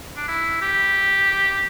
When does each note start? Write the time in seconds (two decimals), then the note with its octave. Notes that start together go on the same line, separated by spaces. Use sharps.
0.16 D4
0.28 E4
0.61 G4